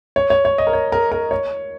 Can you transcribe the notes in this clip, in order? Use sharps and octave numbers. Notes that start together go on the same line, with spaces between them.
C#5
C#5
C#5
D#5
A#4
C#5
A#4
A#4
C#5